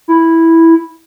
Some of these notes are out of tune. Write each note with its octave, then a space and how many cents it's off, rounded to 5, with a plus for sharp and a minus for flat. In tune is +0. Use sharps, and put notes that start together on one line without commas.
E4 -5